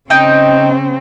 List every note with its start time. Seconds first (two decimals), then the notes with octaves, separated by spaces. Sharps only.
0.10 C#3 C4 D#4 D#5 G5